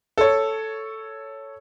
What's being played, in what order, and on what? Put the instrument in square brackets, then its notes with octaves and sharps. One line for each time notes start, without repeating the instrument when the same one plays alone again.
[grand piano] A4 C#5